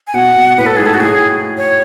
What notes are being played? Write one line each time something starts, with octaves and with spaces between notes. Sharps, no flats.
G#5
B2 F#5
B2
A2 B4
A4
G#2 G#4
A4
F#4
A2 G#4
C#5